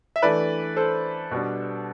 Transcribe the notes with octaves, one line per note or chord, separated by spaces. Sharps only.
E5
E3 A3 D4 B4 D5
A4 C5
B2 G3 B3 D4